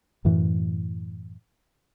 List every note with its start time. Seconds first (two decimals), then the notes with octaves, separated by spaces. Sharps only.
0.25 F#2 A2 E3